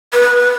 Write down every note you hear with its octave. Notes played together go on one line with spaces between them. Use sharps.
B4